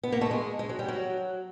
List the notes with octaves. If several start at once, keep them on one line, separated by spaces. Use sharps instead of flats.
B3
A#3
A3
G#3
G#3
F#3
G3
F#3